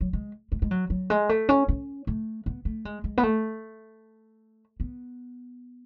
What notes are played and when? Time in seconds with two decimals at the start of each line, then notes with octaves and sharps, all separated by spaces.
0.01 F#3
0.13 G#3
0.52 G#3
0.62 G#3
0.71 F#3
0.90 F#3
1.10 G#3
1.29 A3
1.49 C#4
1.68 C#4
2.07 A3
2.46 B3
2.65 A3
2.85 G#3
3.04 G#3
3.17 B3
3.23 A3
4.80 B3